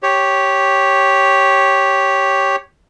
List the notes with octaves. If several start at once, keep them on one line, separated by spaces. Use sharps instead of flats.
G4 C#5